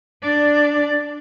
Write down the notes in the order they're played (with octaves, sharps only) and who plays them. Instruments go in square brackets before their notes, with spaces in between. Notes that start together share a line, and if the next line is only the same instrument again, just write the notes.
[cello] D4 D5